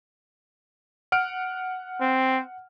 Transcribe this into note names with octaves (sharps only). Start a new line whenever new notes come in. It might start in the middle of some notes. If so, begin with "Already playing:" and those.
F#5 F6 D7
C4